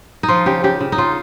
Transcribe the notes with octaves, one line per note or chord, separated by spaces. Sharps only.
D#4
F3 F4
C#3 G4
C#3 G4
C#3
D#4
C#3 F4